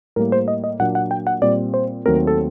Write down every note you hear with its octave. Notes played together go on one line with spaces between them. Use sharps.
A2 G3 A#3 A#4
C5
D#5
D#5
A#2 F#3 A#3 D4 F#5
F#5
G5
F#5
A#2 G3 C4 D5
C5
D#2 D#3 F#3 A3 C4 A#4
A4